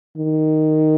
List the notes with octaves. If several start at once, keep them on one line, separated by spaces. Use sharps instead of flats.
D#3